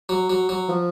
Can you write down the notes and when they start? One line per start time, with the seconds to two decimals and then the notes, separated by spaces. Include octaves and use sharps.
0.09 F#3
0.30 F#3
0.49 F#3
0.68 F3